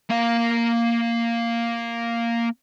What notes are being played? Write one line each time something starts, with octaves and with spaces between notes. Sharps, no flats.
A#3 F5